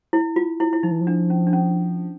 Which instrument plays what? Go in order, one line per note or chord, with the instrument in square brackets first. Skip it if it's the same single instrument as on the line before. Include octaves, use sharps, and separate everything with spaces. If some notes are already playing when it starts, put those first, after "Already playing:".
[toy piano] E4
F4
E4
E4
[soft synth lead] F3 [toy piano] D#4
[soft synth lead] E3
F3
[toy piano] D4
C#4
D4
C#4